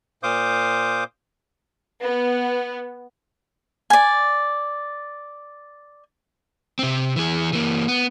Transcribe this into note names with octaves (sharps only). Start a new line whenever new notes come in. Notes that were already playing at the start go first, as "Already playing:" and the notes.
A#2 C5 F5 D6 D#6 G6
B3
D5 G#5
C3 C4
E3 G#4
E3 A#3
B3